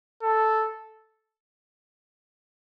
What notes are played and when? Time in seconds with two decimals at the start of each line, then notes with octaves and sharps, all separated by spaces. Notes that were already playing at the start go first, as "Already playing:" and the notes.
0.23 A4